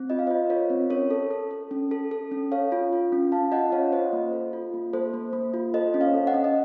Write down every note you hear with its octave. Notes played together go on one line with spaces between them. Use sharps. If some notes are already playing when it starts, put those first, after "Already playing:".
Already playing: C4
F4 D#5
F5
C5 D#5
F4
F4 A#4 C#5
C4
C#4 A#4 C#5
A4
A4
A4
C#4
A4
A4
C#4
A4 C#5 F5
F4
F4
C#4
C#4 F5 A5
F4 D#5 F#5
C#4 C#5 F5
F4 C5 D#5
A#3
A4
F4
A#3
A#3 A4 C5
A#3
A#3
F4
A4 C5 D#5
C#4
C#5 F5
A4
D#5 F#5
C#4
D#5